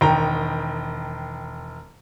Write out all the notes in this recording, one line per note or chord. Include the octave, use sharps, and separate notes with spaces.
E1 D#3 G5 A#5